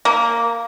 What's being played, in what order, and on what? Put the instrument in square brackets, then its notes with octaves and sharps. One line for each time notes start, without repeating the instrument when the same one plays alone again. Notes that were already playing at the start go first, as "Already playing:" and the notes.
[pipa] A#3